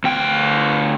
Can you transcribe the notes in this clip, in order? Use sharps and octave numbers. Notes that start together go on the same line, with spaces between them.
D2 G5